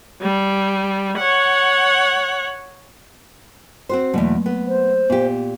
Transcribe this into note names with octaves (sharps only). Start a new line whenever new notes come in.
G3
C#5 F#5
C4 F#4 C5
E2 B2 F#3 A3 A#3
B3
C5
A#2 B3 G4